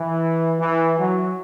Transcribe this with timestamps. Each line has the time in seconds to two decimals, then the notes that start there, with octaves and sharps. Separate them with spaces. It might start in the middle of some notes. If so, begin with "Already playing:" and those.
Already playing: E3
0.60 E3
0.97 F#3